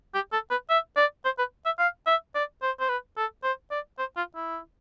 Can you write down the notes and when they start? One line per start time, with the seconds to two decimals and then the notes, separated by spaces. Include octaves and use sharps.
0.14 G4
0.32 A4
0.51 B4
0.70 E5
0.97 D5
1.25 C5
1.38 B4
1.65 E5
1.79 F5
2.07 E5
2.35 D5
2.62 C5
2.80 C5
2.89 B4
3.17 A4
3.44 C5
3.71 D5
3.98 C5
4.17 F4
4.36 E4